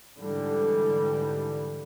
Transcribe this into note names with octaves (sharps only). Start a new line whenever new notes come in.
G#2 D3 E3 G3